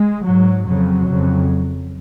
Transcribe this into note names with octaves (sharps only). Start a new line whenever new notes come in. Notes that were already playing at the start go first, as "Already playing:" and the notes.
Already playing: G#3
G#2 F#3
F2 C#3 F#3
F2 C#3